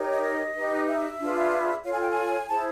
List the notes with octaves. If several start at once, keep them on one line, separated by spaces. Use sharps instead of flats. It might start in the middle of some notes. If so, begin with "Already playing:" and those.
Already playing: D#4 G4 A#4 C#5
D#5
D#5
D#4 G4 B4
E5
D4 F4 G#4 B4
F4 A4 C#5 F5
G#5
G5
G#5
E4 G#4 C5 A5